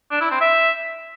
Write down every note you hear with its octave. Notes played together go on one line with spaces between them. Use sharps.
D4
E4
C4
E5